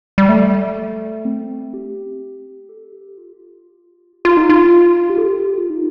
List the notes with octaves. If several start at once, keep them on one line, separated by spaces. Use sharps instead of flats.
G3
A3
C4
G4
A4
G4
F4
G4
F4
G4
F4
D#4
F4
G4
A4
G4
F4
D#4